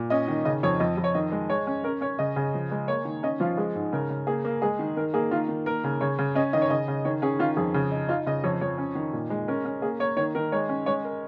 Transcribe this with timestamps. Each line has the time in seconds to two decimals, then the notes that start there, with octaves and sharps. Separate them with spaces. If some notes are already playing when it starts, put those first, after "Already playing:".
Already playing: A#2
0.10 C#4 D#5
0.28 D#3
0.45 C#3 D#5
0.63 F2 C#5
0.80 F2 D#5
0.97 F2
1.04 C#5
1.15 D#3 D#5
1.32 G#3
1.50 G#3 C#5
1.67 C#4
1.84 C#4 A#4
2.01 C#4 C#5
2.19 C#3 D#5
2.36 C#3
2.54 F3
2.71 G#3
2.88 A#3 C#5
3.05 D#3
3.23 C#4 D#5
3.40 F3 F4
3.57 G#3 G#4
3.75 G#2
3.92 C#3 A#4
4.10 C#3
4.27 A#3 G#4
4.45 A#3
4.62 G#3 G#4
4.79 D#3
4.97 D#3 A#4
5.14 A#3 G#4
5.31 D#3 F4
5.48 D#3
5.66 A#3 A#4
5.84 C#3
6.01 C#3 C#5
6.18 C#3
6.35 C#4 D#5
6.53 D#3 D#5
6.62 C#5
6.70 C#3 D#5
6.88 C#3
7.05 D#3 C#5
7.22 C#4 G#4
7.39 D#3 F4
7.57 F2 G#4
7.74 C#3
7.91 D#4
8.08 D#4 F4
8.26 C#3 D#5
8.44 F2 C#5
8.61 F2 C#5
8.78 C#4
8.95 D#3
9.13 A#2
9.30 G#3
9.48 C#4 A#4
9.65 C#4
9.82 A#3 G#4
10.00 A#3 C#5
10.17 D#3 C#5
10.35 D#3 A#4
10.52 G#3 C#5
10.69 C#4
10.86 G#3 C#5
11.05 A#4